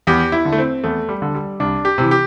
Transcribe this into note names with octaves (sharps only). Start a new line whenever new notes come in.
E2 G4
E4
D3
A3
C4
E2 A3
G3
D3
G3
C2 D4
G4
C3 E3
G4